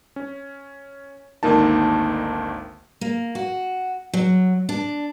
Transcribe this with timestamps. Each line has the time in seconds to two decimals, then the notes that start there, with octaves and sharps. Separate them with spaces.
0.16 C#4
1.43 G#1 D2 D#3 A#3 D#4 A5
3.01 A#3
3.35 F#4
4.14 F#3
4.69 D4